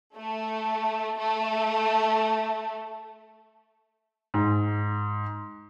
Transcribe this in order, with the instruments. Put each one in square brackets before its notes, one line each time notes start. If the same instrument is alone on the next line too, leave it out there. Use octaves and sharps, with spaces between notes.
[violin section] A3
A3
[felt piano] G#2